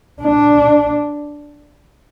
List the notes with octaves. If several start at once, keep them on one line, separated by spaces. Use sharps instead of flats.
D4